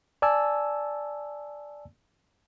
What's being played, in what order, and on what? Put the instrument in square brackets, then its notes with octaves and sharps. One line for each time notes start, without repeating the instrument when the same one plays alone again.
[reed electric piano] D5 G#5 A5 E6